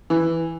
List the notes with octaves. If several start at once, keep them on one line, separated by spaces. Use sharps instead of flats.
E3